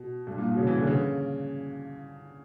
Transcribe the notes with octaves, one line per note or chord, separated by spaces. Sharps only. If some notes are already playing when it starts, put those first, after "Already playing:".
Already playing: B2
G2
A#2
B2
C#3
E3
D3
C#3